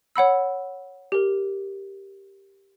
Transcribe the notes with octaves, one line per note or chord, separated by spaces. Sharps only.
C#5 F#5 B5 E6
G4 A#4